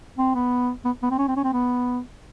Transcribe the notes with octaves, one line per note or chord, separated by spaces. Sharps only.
C4
B3
B3
B3
C4
C#4
C4
C#4
C4
B3